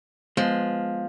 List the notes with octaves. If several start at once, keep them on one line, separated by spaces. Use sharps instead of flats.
F3 G#3 B3